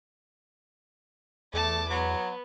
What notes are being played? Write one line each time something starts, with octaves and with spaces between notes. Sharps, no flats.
E2 A3 A5 D6
F#3 B3